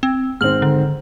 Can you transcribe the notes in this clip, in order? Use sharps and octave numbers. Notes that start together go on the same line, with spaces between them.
C4
G#2 D#3 C4 F6 F#7
D3